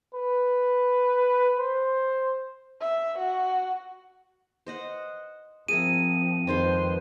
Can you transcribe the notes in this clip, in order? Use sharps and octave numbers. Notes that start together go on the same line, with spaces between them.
B4
C5
E5
F#4
C5 D#5 F#5
F3 C4 G#4 A#4 E5 D#7
F2 D#3 G#3 B4 C5